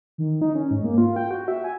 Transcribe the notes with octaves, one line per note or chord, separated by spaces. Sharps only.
D#3
D#4
C#4
G#2
A#3
F4
G5
F#4
E5
G#5